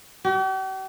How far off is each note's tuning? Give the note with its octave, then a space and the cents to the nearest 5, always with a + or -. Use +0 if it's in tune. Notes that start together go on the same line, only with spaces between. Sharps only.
G4 -45